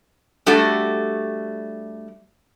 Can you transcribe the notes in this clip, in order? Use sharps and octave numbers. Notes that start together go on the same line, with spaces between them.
G3 A3 D4 F#4 G4 A4